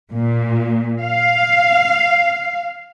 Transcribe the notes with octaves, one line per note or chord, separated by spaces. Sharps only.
A#2
F5